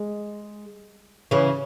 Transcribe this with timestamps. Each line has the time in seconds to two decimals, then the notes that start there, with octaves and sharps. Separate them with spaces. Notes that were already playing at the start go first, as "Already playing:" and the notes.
Already playing: G#3
1.31 C#3 E3